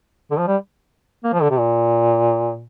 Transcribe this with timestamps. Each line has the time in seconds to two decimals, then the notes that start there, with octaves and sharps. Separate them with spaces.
0.31 D3
0.39 F3
0.47 G3
1.24 A#3
1.33 F3
1.42 D3
1.51 C3
1.59 A#2